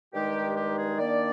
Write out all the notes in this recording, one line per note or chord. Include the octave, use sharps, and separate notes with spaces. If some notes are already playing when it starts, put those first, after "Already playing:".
G2 D#3 G#3 D#4 G4
G4
G#4
D#3 A#3 D4 D5